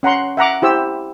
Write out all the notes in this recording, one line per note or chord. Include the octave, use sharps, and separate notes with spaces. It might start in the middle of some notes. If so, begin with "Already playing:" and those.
C#4 F#5 A#5 C6
E5 F#5 A#5 D6
E4 G4 C5 E6